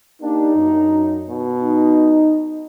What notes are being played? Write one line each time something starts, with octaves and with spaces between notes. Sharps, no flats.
A#3 D4 D#4 G4
F#2
B2
D#4